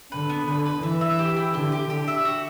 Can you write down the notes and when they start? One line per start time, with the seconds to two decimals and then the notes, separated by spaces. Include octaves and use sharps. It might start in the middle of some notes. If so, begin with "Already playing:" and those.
0.12 D3 B4
0.30 B3
0.48 D3 B4
0.65 B4
0.83 E3 E5
1.01 E5
1.19 G4
1.37 E4
1.54 D3 G4
1.72 G4
1.90 D3 G4
2.08 E5
2.25 F#4